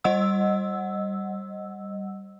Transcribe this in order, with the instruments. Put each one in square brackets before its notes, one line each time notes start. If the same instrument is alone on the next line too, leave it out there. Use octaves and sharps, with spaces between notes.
[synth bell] G3 D#5 F#5 E6